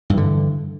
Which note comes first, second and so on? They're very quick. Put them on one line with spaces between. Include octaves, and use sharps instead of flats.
G2 E3 D3